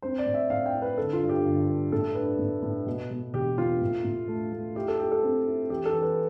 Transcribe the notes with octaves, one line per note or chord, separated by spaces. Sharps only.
C4 C5
D5
A2
E5
A2 F5
G5
E4
B4
D3 A4
F4
G2
G4
G1
G2
A2 A4
D4 B4
A2
A2
B2
B2
E1 G4
E2 F4
A2
A2
A3
A3
E4 G4
A4
E4 G4
A4
C4
E4
E3 G4
A4
E3
B4